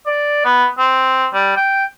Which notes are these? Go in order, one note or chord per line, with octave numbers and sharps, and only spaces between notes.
D5
B3
C4
G3
G5